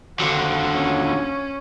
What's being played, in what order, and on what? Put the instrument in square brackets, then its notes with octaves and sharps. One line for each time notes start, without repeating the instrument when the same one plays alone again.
[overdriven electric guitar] D#2 D3 [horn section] F3 F4 F#4 [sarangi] C4
[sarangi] C#4